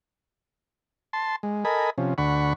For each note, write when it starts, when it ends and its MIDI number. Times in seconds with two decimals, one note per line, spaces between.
1.13 1.36 81
1.13 1.36 84
1.43 1.64 56
1.65 1.90 69
1.65 1.90 70
1.65 1.90 75
1.65 1.90 80
1.65 1.90 83
1.98 2.14 48
1.98 2.14 53
1.98 2.14 61
2.18 2.53 38
2.18 2.53 50
2.18 2.53 78
2.18 2.53 83
2.18 2.53 85